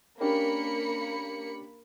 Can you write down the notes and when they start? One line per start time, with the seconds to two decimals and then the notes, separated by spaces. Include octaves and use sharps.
0.21 A#3 C#4 D4 G4 A#4 B5 C#7